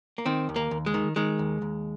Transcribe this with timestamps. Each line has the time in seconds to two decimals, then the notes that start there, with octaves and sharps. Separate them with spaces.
0.18 A#3
0.26 D#3 C4
0.49 D#2
0.56 A#3
0.71 D#2
0.86 G#3
0.94 D#3
1.16 D#3 G#3
1.39 D#2
1.62 D#2